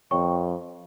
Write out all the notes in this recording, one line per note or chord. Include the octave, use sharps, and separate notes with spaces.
F2 C#5 G5 C#6